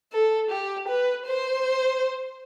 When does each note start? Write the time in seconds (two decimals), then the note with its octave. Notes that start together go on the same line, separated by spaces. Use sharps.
0.12 A4
0.50 G4
0.88 B4
1.26 C5